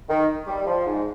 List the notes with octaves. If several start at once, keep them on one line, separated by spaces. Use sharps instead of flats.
D#3
G3
F3
G#2